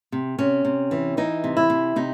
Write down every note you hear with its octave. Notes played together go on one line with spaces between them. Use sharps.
C3
C3 C#4
C3
E3
E3 D#4
C3
E4
C3
C3 D#4